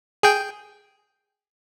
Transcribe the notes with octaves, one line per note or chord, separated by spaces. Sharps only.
G#4 G5